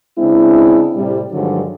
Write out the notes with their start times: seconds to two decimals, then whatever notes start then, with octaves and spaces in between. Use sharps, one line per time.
0.18 C#3 G#3 C4 D4 E4
0.95 A2 C3 G3
1.31 G2 D3 D#3 F3 F#3 G#3